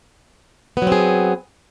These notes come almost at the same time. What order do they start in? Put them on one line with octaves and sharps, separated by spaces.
B3 F#3 C4 G#4